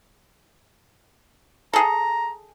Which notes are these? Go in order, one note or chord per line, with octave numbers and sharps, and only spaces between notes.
G#4 A4 A#5